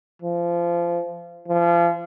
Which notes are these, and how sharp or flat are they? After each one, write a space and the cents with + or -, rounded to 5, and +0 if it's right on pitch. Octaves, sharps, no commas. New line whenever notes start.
F3 -25
F3 -30